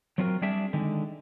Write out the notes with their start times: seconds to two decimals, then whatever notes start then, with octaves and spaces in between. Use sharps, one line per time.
0.18 F#3 C4 F4 F#4 G#4 A#4
0.42 G3 C4 D4 G#4 E5
0.73 D3 D#3 G#3